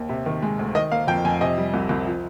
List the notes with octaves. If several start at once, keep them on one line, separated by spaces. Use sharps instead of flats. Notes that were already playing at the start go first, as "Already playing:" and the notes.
Already playing: D#2
C3
D#3
G#3
D2
D#3 D#5
A#3 F5
F2 G5
F2 G#5
C3 D#5
G3
C2
C2
F3